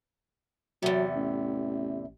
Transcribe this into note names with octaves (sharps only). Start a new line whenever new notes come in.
E2 C3 F#3
A1